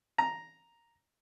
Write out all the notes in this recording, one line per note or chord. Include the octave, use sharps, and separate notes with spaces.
A#5